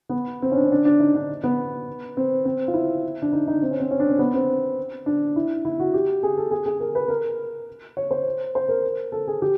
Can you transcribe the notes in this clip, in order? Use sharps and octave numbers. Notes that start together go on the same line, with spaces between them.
B3
C4
C#4
D4
C#4
D4
D4
D#4
D4
B3
C4
C4
F4
E4
D4
D#4
D#4
C4
C#4
C4
C#4
D4
C4
B3
C4
D4
E4
E4
F#4
G4
G#4
A4
G#4
G#4
A#4
B4
A#4
C#5
C5
C5
A#4
A4
G#4
G4